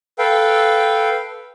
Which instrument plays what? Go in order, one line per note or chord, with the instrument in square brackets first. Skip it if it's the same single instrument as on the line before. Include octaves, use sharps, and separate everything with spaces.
[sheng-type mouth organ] A4 B4 F5 G5